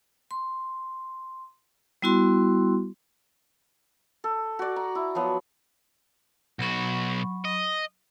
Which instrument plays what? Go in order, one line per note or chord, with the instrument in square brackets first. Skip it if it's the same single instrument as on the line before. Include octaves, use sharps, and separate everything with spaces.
[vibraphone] C6
G3 B3 E4 F#4 C6
[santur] A4
F#4 D5
A#5
E4
F3 F#3 B3
[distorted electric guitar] B1 F#4 [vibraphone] F#3 B5 C#6
[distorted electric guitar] D#5